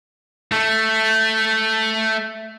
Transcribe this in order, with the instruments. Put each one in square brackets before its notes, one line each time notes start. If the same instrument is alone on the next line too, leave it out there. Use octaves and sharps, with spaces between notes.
[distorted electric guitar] A3 A4